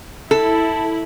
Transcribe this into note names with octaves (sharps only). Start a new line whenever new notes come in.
E4 A4